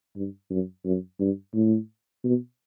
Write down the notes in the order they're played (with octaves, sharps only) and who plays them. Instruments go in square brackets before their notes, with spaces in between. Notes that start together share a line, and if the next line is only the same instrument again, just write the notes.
[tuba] G2
F#2
F#2
G2
A2
B2